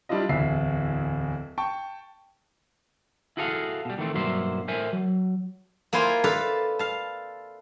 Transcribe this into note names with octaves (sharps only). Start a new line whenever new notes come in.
G3 D4 E4 F4 D#5
D1 E2 E5 C7
G5 A5 C#6
E4 F#4 G#4 A4 C#5 F5
B2 G3
D#3 E3 A3 C4
B1 G2 F#3 A#3 C5 E5
A2 A#4 C5 E5 G#5
F#3
A#3 E4 F4 C5 G#5
A4 B4 D5 F5 A5
F5 A5